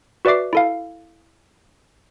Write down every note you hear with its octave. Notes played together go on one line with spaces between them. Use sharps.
F#4 B4 D5 E5 D6 C7
E4 A4 F5